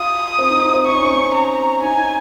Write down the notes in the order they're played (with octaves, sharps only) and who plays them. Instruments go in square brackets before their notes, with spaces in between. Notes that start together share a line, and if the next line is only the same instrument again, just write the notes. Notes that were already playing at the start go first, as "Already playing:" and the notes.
Already playing: [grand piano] F4 [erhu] D#6
[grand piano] C4
D#4
C4
[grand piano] D#4 [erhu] C#6
[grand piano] C#4
C4
C#4
[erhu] A#5
[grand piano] D#4 [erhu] G#5